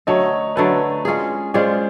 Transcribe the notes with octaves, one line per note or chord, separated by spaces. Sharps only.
D3 F#3 A3 C#5 D#5
D3 F#3 A3 B4 C#5
G#3 C#4 F4 G#4
G#3 C#4 F4 G#4 C5 D5